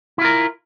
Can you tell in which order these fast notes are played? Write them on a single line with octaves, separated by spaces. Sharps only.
E4 F4 A#4